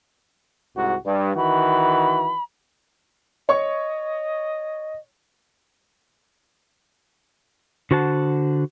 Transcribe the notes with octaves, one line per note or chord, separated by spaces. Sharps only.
C2 G#2 F#4
G2 D5
D#3 E3 F#4 B5
C#5 D#5 C#6
D3 F#4 C5 F#5 A5